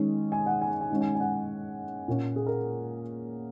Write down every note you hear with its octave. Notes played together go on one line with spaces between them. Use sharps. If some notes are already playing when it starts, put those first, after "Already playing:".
Already playing: D#3 G#3 C#4
G#5
F#5
G#5
G#5
D#3 G#3 C#4
G#5
G#5
F#5
A#2 A#3 C#4
G#4
A#4